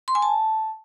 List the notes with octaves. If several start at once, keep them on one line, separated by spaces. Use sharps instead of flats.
C6
G#5
A5